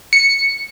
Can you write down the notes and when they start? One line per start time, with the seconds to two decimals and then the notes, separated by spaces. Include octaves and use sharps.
0.13 C#7